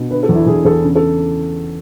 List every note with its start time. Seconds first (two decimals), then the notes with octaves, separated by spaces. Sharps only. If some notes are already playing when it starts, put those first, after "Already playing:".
Already playing: B2
0.11 D3 B4
0.23 A4
0.29 E2
0.35 E4
0.46 E2 G#4
0.65 E2 A4
0.84 C#3
0.95 A4